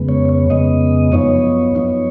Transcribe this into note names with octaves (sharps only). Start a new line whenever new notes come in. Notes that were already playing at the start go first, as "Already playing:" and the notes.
Already playing: F2 C#3 G#3 B3
C#5
C#5
F2 C#3 G#3 B3 D#5
F#2 F3 B3 D#4 C#5
F#2 F3 B3 D#4